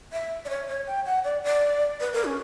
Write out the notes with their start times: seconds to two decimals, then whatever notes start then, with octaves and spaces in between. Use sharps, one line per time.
0.13 E5
0.45 D5
0.50 C#5
0.68 C#5
0.87 G5
1.06 F#5
1.24 D5
1.44 D5
2.01 B4
2.13 A#4
2.25 C#4